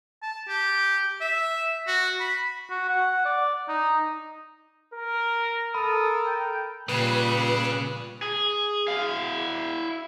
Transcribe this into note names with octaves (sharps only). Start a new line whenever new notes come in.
A5
G4
E5
F#4
B5
F#4
F#5
D5
D#4
A#4
A4 A#4 B5 D#6
G5
A#2 C#3 G3 B4 F#6
G#4
E4 F5